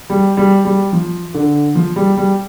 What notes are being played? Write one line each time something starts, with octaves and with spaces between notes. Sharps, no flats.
G3
G3
G3
F3
D3
F3
G3
G3